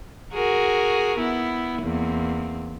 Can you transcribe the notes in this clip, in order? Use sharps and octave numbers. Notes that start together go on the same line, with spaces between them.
F#4 G#4 A#4
B3 E4
E2 A#3 C4